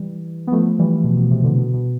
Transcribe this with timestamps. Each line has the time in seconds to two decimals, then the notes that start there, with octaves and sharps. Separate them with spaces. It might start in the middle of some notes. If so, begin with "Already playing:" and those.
Already playing: E3 G3
0.47 B3
0.52 F3 A3
0.79 E3 G3
1.04 B2
1.17 B2
1.31 C3
1.44 B2 D3
1.58 B2
1.74 B2